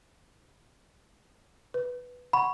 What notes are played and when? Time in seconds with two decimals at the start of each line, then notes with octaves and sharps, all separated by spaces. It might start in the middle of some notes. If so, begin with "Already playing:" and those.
1.74 B4
2.33 F#5 B5 C#6